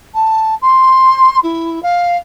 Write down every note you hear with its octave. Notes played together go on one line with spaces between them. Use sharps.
A5
C6
E4
F5